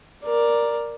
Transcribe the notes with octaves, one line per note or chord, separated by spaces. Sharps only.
A#4 D5